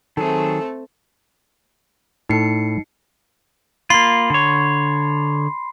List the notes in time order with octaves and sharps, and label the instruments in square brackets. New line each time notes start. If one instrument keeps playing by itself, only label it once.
[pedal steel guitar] D#3 F#3 G#4 [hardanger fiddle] A3 C4 [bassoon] A4
[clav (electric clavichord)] A2 A4 [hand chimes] D#4 C7 C#7
[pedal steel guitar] A#3 F4 [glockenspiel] B5 C6 C7
[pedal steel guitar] D3 C#5